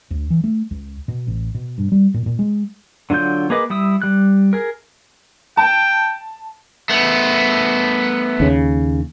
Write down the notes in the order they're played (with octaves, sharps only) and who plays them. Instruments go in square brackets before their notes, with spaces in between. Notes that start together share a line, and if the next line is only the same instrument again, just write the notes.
[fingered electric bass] D2
E3
A3
C#2
B2
A1
B2
G2
G3
A#2
A#2
G#3
[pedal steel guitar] D3 D#3 F#3 F4 G6
A#3 G#4 B4 D#5 D6
G3 E4 D#6 E6
G3 F#6
G#4 A#4
[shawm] G5 [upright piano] A5
[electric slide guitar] A3 B3
[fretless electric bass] D#2 C#3